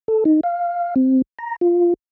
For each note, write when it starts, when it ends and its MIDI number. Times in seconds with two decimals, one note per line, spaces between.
0.08 0.24 69
0.25 0.41 63
0.43 0.94 77
0.96 1.22 60
1.39 1.56 82
1.61 1.94 65